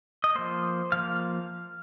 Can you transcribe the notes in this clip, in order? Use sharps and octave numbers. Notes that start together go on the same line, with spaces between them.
D#5
F3 A#3 C5
F3 A#3 F5